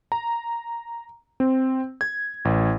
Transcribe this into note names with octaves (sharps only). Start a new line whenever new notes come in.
A#5
C4
G#6
A1